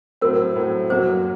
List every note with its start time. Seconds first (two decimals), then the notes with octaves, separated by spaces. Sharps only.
0.21 A2 F#3 C4 A#4
0.56 A2 F#3 C4
0.90 F#2 F#3 A#3 F#4 C5